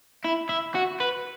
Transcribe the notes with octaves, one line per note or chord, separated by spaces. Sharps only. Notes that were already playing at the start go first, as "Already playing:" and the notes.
E4
E4
F#4
B4